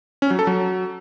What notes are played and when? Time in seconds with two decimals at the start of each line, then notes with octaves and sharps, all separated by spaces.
0.22 C#4
0.30 F#3
0.39 A4
0.47 F#3